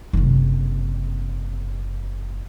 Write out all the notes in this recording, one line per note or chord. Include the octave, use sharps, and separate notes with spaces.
F#1 C3